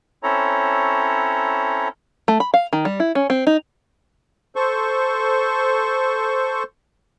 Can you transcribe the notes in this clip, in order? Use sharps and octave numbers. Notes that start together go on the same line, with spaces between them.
C4 C#4 E4 A4 C#5 A#5
A3
B5
F5
D#3
G3
E4
C#4
C4
D#4
A4 C5 C#6